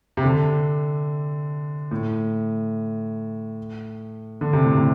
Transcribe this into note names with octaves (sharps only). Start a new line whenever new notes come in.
C3
D3
A2
D3
C3
A2
C3